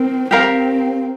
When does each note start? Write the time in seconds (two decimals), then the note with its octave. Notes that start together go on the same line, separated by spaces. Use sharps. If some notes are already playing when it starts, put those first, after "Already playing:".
Already playing: C4 A#4
0.31 C4 G4 A#4 F5 A#5